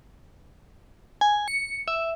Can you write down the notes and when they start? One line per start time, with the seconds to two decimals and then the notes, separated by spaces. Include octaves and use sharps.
1.21 G#5
1.48 C#7
1.88 E5